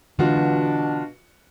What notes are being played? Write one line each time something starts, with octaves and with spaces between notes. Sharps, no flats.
B2 D3 E3 G#3 D4 F4 F#4